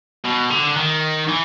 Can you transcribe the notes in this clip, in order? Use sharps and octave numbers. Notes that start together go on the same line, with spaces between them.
B2
D3
D#3
E3